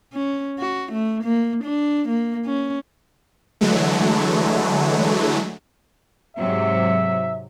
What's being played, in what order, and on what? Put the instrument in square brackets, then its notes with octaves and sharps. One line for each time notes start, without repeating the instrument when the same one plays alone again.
[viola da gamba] C#4
F#4
A3
A#3
D4
A#3
C#4
[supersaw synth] D3 E3 F#3 G#3 A3
[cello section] G#2 C3 F#3 [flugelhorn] E5